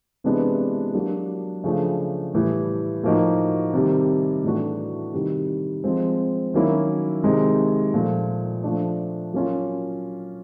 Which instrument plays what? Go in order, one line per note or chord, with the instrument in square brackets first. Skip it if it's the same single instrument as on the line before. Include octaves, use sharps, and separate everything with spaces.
[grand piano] C3 E3 G#3 B3 D4
F#3 A#3 D4 G4
C#3 F3 A3 D4
A2 E3 G3
A2 F3 A#3 D#4 F#4
C3 D#3 G3
A2 E3 A3 D4 F#4
C3 D#3 G3
F3 G#3 C4
D#3 F#3 A#3 C#4 E4
C3 D#3 G#3
A#2 F3 A3
F3 A3 D4
F#3 A#3 C#4 F4